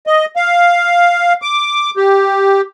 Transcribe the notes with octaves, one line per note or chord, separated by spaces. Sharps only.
D#5
F5
D6
G4